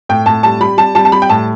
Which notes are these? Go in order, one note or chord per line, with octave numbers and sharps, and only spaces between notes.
A2 G5
A2 A5
G3 A5
G3 B5
G3 A5
G3 A5
A5
G3 B5
G5
A2 A5